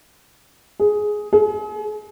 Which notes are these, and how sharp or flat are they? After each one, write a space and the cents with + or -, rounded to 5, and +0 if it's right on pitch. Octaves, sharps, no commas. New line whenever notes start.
G#4 +10
G#4 +40